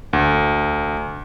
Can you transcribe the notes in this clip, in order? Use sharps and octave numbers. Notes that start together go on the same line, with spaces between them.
D2